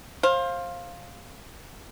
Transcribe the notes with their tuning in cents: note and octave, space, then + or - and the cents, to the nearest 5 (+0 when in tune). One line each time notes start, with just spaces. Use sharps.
C5 +25 F5 +0